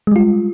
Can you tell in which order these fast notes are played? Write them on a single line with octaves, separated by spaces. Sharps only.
G#3 G3 F4